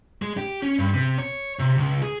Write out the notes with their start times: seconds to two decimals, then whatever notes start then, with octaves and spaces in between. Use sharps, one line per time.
0.22 G#3
0.38 G4
0.62 C#4
0.79 G2
0.94 C3
1.18 C#5
1.59 C3
1.78 C#2
2.02 G#4